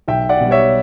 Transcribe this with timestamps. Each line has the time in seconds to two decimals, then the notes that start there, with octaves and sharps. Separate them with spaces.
0.08 B1 E5 G5
0.29 D5 F#5
0.41 B2 G3
0.51 C#5 E5